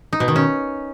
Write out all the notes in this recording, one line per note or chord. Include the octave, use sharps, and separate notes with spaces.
D#4
B2
D#3
C#4